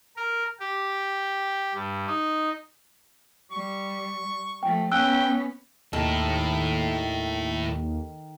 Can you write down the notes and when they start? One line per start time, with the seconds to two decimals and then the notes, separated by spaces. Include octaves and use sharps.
0.17 A#4
0.59 G4
1.74 G2
2.07 D#4
3.52 G3 C#6
4.63 F3 A3 G5
4.92 B3 C#4 G5 E6 F#6
5.93 D#2 A2 D#3 A4